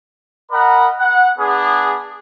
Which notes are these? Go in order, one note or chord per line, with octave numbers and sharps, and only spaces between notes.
A#4 D#5 F#5 B5
F#5
B3 D4 G#4